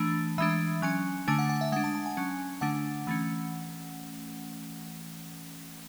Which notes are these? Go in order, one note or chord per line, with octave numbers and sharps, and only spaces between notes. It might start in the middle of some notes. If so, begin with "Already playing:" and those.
Already playing: E3 A3 D4 A5
E3 G#3 D4 E5
F#3 C#4 G#5
D3 A3 D4 G#5
F#5
F#5
E5
G#3 D4 F#5
A5
A5
G#5
F#3 C#4
D3 A3 D4 F#5
E3 A3 C#4